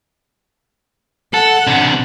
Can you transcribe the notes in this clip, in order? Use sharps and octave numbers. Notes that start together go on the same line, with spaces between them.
A4 F#5
C3 D4